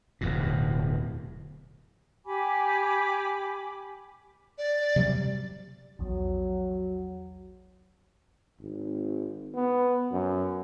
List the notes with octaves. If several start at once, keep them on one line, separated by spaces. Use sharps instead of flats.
D1 E2 B2
G4 G#5 B5 D6
D5
C3 F#3 G3
A#1 E2 F#3
G#1
B3
F#2